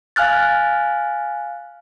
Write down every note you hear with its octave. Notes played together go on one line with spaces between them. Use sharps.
F5 G#5 F6 F#6 A6